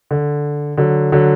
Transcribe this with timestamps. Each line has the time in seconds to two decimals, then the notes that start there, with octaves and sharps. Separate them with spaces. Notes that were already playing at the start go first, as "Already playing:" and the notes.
0.11 D3
0.78 D3 F#3
1.12 D3 F#3